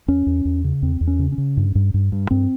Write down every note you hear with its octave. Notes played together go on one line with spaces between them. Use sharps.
E2 C#4
E2
E2
C#3
E2 C4
E2
C#4
C#3
C#4
C#3
G2
G2
G2
G2
G2 C4